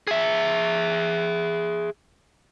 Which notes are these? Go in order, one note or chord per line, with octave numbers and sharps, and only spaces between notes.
G#4 E5